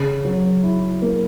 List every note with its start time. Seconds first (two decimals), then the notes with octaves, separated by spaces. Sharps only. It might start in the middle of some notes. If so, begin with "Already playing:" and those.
Already playing: C#3
0.25 F#3
0.63 E4
1.02 A#3